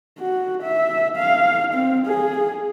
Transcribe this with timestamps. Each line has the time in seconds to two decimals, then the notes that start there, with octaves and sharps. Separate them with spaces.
0.19 F#4
0.62 E5
1.17 F5
1.74 C4
2.06 G#4